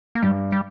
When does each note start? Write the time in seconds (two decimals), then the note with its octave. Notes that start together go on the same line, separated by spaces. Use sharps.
0.15 A#3
0.23 G2 G3
0.52 G3